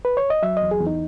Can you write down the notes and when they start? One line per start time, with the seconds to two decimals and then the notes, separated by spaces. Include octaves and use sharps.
0.05 B4
0.17 C#5
0.30 D#5
0.43 F#3 E5
0.57 D#5
0.62 E2
0.71 G#4
0.81 E2
0.87 D#4